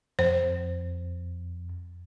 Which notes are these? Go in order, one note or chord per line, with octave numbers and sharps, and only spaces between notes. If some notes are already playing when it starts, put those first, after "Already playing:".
F2 C5